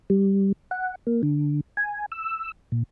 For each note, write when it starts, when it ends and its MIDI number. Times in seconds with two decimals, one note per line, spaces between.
0.10 0.52 55
0.71 0.95 78
1.07 1.22 58
1.23 1.61 50
1.77 2.06 80
2.12 2.52 88
2.72 2.83 46